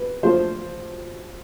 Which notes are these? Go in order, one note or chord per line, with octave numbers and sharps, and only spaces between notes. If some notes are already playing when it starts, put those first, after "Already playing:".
Already playing: B4
F3 A3 D4 F4 C5